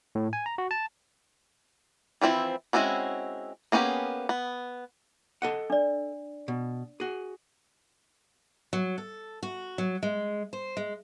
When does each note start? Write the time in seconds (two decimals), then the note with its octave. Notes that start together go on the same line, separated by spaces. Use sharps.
0.15 A2
0.33 G#5
0.46 A#5
0.58 F#4
0.71 A5
2.21 E3 F3 C4 E4
2.73 G#3 C4 C#4 E4 F#4
3.72 A#3 B3 C#4 G4 G#4
4.29 B3
5.42 A4 D#5 F#5
5.70 D4 D5
6.48 B2
7.00 F#4 G#4
8.73 F#3
8.98 A4
9.43 F#4
9.78 F#3
10.03 G#3
10.53 C5
10.77 G#3